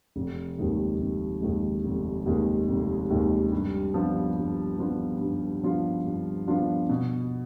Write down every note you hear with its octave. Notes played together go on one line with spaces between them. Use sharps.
F1
D#2 D#3 G#3
F1
D#2 D#3 G#3
F1
D#2 D#3 G#3
F1
D#2 D#3 G#3
G2
F3 B3 D4 F4
G2
F3 B3 D4 F4
G2
F3 B3 D4 F4
G2
F3 B3 D4 F4
B2